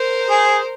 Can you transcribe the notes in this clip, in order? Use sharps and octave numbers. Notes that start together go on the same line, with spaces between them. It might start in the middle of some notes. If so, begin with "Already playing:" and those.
Already playing: A#4 C5
G#4